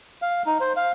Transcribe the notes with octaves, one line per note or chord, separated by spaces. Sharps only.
F5
D#4
C5
F5